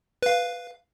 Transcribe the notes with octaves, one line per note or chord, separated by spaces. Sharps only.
B4 F5